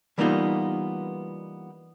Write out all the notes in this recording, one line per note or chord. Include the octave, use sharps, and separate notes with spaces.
E3 G3 A#3 B3 D#4 F4